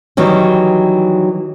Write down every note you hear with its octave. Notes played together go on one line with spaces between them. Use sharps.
D#3 E3 F#3 G3